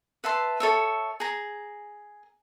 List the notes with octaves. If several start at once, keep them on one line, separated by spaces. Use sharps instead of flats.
B4 E5 A5 C6
A4 C#5 E5
G#4 A#5